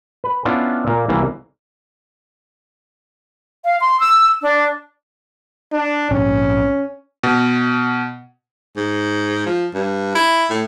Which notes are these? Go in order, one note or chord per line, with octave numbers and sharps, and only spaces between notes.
B4
B3 C#4 D4 E4 F4
A#2 A#3
C2 B2 E3 A#3
F5
C6
E6
D4
D4
A#1 G#2 C4 C#4
B2
G#2
F3
G2
E4
A2